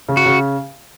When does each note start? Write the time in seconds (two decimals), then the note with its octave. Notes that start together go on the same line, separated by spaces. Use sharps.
0.09 C#3
0.17 F#4
0.26 C#3